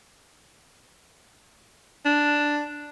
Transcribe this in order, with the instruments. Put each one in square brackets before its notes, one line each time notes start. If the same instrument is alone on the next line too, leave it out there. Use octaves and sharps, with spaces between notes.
[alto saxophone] D4